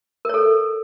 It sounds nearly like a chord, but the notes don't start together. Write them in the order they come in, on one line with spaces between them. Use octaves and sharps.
A#4 C#5 A4